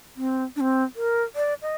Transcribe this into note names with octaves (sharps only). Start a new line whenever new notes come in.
C4
D4
C4
A#4
D5
D#5